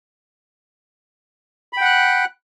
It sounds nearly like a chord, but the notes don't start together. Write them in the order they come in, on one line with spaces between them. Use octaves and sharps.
B5 G5 F#5 F#6